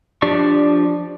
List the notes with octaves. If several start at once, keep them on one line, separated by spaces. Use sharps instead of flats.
F3 D4 G4 D5 C#6